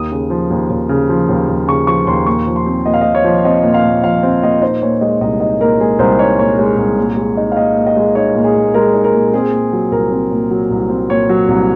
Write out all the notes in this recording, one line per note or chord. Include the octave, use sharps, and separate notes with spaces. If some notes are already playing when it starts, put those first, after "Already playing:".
Already playing: D#2 D#6
C#3
F3
D#2
D#2
C#3
F3
D#2
D#2
C#3 C#6
F3 C#6
D#2 C6
A#2 C#6
F3
C6
C4
A#2 D#5
F5
A#2 D#5
C#5
F3
C4 D#5
A#2
F5
A#2
F3 F5
C4
A#2 D#5
D#4 C5
A#2 C#5
G#3 D#5
C2 D#5
D#4 D#5
A#2 A#4
G#3 G#4
C2 C5
D#4 C#5
A#2 C#5
G#3
C2
A#2
G#3
D#4
F5
A#2 D#5
A#2
D#5
G#3
D#4 C#5
A#2
G#4
A#2
G#3 A#4
D#4
A#4
A#2
C4 G#4
A#2
F#3
C2 A#4
C4
A#2
F#3
C2
C4
A#2 C#5
F#3
C2